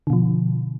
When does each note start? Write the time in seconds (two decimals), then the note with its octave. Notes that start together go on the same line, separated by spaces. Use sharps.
0.07 D3
0.10 B2
0.13 F3